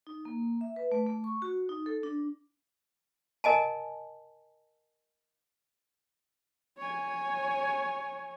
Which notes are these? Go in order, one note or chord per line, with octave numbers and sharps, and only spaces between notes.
D#4
A#3
E5
B4
A3
A3
C#6
F#4
D#4
A4
D4
A#4 D#5 G#5 A5
C#5 G#5